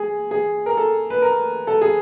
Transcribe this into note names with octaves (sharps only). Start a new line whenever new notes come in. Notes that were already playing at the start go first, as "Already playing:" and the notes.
Already playing: G#3 G#4
G#4
A#4
A4
B4
A#4
A4
G#4